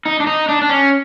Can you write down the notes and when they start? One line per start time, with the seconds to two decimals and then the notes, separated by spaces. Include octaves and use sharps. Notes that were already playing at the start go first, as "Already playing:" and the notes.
0.06 D#4
0.20 D4
0.27 D#4
0.49 D4
0.62 D4
0.69 C#4